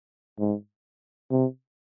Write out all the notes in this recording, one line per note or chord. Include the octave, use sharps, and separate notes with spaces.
G#2
C3